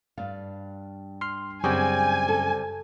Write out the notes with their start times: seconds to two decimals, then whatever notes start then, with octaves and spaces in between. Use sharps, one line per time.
0.18 G2 D5 F5
1.21 C6 F6 C7
1.64 F#2 C#3 G3 C4 G#5
2.28 A4